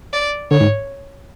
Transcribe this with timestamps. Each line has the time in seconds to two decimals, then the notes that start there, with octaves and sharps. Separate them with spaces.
0.13 D5
0.51 D3 C#5
0.60 G#2